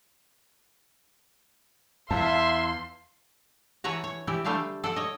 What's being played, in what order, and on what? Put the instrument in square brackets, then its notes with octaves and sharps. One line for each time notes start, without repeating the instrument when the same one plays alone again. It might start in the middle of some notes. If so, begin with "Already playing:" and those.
[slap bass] E2 [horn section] E5 [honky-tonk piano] F5 A5 [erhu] C6
[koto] E3 B4 C#5 F#5 A5 A#5
C#5
E3 E4 G4 D5
D3 G3 A3 F5 G5 A5
A4 D5 F#5
C#5 D#5